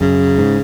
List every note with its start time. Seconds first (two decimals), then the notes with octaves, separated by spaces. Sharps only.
0.01 F#2 C#3
0.38 G#2